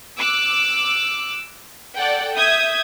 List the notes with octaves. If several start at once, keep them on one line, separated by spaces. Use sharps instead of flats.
D6 E6 F#6
A4 D5 F#5 G5
E5 D#6 G6 G#6